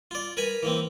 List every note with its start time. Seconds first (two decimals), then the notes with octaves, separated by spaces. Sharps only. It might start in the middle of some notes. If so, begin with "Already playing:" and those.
0.11 F4 D5
0.37 A#4 B4 G#5 B5
0.63 E3 A#3 C4